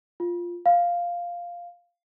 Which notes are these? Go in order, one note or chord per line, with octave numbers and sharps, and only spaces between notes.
F4
F5